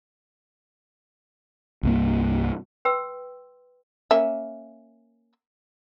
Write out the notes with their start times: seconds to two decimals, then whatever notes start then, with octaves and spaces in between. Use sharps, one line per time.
1.83 C2 G2 A#3
2.85 B4 G5 C6 E6
4.11 A#3 C#4 E5